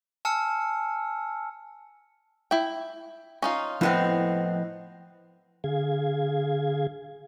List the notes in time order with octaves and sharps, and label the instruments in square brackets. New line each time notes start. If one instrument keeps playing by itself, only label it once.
[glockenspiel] G#5 A5 E6 F6 C#7
[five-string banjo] E4 G5
C#4 D#4 F4
[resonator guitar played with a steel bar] A2 B3 C4 [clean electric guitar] F3 E4 D#5
[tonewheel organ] D3 G#4 F5 G#6